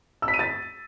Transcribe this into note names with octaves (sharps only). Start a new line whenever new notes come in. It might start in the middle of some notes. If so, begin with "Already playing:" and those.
E6
B6
D#7
A6